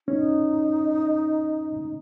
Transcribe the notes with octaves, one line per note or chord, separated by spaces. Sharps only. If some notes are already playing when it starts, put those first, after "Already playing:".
C#4 D#4